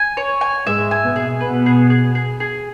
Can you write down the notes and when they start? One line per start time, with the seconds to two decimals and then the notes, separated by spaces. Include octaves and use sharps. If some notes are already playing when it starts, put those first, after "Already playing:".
Already playing: G#5
0.17 C#5
0.41 G#5
0.66 G#2 G#3 E5
0.91 G#5
1.04 B2 B3
1.16 G#4
1.40 B2 B3 B4
1.66 G#4
1.90 G#4
2.15 G#4
2.40 G#4